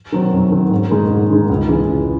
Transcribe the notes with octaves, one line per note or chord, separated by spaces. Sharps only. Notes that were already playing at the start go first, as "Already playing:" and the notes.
D#3 F#3 C4
F#2
D#3 F#3 C4
G#2
D#3 G#3 D#4
G#2
D#3 G#3 D#4
C#2
C#3 E3 G#3
C#2